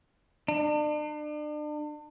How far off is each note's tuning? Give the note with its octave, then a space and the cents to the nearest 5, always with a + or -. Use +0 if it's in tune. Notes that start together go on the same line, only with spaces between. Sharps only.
D4 +40